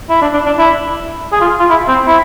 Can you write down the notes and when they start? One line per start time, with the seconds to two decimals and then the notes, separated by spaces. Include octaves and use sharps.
0.09 E4
0.22 D4
0.33 D4
0.46 D4
0.58 E4
1.33 G#4
1.41 F4
1.59 F4
1.70 E4
1.88 C4
2.07 E4